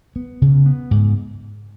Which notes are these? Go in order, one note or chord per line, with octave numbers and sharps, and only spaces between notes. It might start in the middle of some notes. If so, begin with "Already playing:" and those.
B3
C#3
B3
G#2